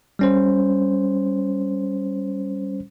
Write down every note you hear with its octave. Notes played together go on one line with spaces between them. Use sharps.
G3 C#4 C5